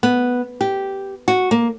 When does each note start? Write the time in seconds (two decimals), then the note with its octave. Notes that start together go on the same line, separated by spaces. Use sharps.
0.03 B3
0.61 G4
1.28 F#4
1.51 A#3